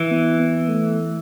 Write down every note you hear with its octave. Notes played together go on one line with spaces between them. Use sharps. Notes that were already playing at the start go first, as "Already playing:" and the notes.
Already playing: E3
B3
B3
A3